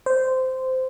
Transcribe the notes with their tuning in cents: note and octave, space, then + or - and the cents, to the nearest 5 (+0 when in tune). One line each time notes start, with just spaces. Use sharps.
C5 -15